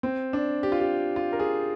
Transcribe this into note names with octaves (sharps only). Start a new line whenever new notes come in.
C4
D4
G4
F4
G4
F4
A#4
G#4